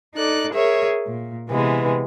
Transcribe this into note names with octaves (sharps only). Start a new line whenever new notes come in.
D#4 A4 D5 F#6
G#4 A#4 C#5 E5
A#2
C3 E3 G#3 B3